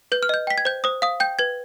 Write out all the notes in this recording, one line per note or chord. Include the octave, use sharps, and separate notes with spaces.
B4 G6
F6
D#5 G6
G5 B6
G#6
C5 G6
C5 D#6
F5 D#6
G5 G6
B4 G#6